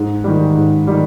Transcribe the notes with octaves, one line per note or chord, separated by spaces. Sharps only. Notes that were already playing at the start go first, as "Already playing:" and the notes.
Already playing: G#2
D#3 G3
G#2
D#3 G3